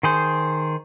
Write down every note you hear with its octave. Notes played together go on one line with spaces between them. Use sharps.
D#3 G#4 C5